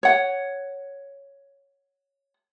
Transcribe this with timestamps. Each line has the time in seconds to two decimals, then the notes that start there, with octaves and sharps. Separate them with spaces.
0.03 C#5 F#5